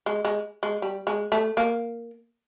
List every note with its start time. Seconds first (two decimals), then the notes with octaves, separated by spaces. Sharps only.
0.06 G#3
0.25 G#3
0.63 G#3
0.82 G3
1.07 G#3
1.32 A3
1.57 A#3